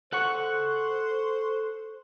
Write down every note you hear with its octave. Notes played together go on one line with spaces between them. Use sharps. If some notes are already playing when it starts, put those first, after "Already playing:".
A4 C5 F#5 C#6 F#6